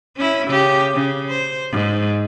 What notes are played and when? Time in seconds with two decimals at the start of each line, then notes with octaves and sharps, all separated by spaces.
0.16 C#4 E4
0.48 C#3 G4
0.94 C#3
1.30 C5
1.71 G#2